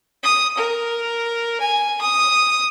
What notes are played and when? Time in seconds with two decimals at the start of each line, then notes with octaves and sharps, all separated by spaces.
0.23 D#6
0.57 A#4
1.60 G#5
2.01 D#6